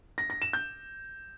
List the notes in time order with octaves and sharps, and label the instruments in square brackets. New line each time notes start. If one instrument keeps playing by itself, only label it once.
[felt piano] A#6
A#6
E7
G6